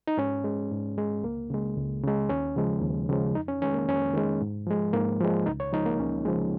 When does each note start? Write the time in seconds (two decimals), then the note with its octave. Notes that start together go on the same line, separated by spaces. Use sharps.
0.07 D#4
0.17 G#2 C#4
0.44 G#3
0.71 G#2
0.98 G#3
1.24 C#2 A#3
1.50 C#3 G#3
1.77 C#2
2.04 C#3 G#3
2.30 D#2 C#4
2.56 C#3 F3 G#3
2.82 D#2
3.09 C#3 F3 G#3
3.35 F2 D#4
3.48 C#4
3.62 D#3 G#3 C#4
3.74 A#3
3.88 F2 C#4
4.14 D#3 G#3
4.42 G#2
4.67 F3 G#3
4.93 G#2 A#3
5.21 F3 G#3
5.46 C#2 D#4
5.60 C#5
5.73 C#3 F3 G#3 D#4
5.86 A#3
5.99 C#2 C#4
6.25 C#3 F3 G#3